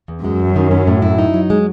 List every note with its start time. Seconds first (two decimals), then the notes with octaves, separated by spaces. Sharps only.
0.08 E2
0.24 F#2 G#3
0.39 E2
0.56 D#3
0.71 C#4
0.87 A2
1.02 E4
1.18 D#4
1.34 F#3
1.50 G#3